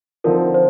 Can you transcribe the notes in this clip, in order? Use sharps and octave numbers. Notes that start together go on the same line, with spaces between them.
D3 F3 C4 D#4 A#4
C5